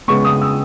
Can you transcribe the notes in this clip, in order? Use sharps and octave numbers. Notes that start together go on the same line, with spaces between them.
C#3 G#3 B3 C#6
D#6
E6